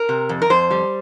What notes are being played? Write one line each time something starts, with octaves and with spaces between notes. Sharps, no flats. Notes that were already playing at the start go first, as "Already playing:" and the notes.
Already playing: A#4
C3
F2
A#4
F2 C5
G3